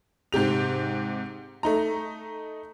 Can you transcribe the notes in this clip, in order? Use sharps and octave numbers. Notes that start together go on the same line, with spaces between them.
G#2 C3 G4 F7
A3 D#4 A#5